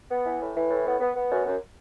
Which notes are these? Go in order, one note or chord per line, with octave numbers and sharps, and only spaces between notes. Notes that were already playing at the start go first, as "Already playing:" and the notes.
B3
E3
A2
E3
A2
B3
B3
B3
F#2
F#2